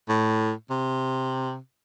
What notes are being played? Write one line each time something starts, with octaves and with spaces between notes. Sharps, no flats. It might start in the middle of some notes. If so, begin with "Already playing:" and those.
A2
C3